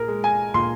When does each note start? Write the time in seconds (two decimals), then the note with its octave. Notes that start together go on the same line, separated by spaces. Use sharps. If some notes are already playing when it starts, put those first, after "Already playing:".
Already playing: A#2 G#4 A#4
0.08 G#3
0.24 G#5
0.54 A#2 C6